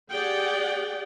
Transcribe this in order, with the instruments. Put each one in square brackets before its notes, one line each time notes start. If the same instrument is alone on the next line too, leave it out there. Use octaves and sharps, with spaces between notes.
[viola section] G4 G#4 D5 F#5 G5